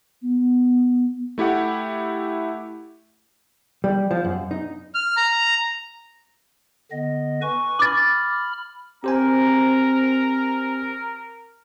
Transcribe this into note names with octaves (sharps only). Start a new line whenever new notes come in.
B3
A3 E4 G4 F#5
G3
F3
F#2
D#4
F6
A#5
D3 B3 D#5
B4 G#5 C#6
B5 D6 F6 A6
C4 G4 A#4 C5 G#5 A#5